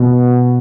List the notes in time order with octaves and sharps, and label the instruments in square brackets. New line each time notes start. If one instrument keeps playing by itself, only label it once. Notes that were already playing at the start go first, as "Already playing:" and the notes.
Already playing: [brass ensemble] B2